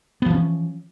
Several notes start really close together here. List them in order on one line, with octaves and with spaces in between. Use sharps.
B3 F3 E3 C#4